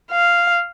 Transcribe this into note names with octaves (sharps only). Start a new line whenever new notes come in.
F5